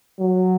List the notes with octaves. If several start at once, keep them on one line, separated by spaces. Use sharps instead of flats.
F#3